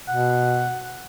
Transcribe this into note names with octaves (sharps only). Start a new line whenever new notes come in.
B2 F#5